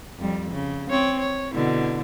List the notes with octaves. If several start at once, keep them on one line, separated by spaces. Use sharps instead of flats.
F2 G3
C#3
C4 C#5
C#5
B2 D3 E4